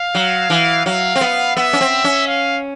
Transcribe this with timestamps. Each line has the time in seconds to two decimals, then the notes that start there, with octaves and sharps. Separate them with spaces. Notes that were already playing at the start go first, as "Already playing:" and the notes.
Already playing: F5
0.15 F#3
0.50 E3
0.86 F#3 F5
1.16 C4
1.21 B3
1.56 B3 E5
1.73 C#4
1.81 C4
2.04 C#4
2.28 F5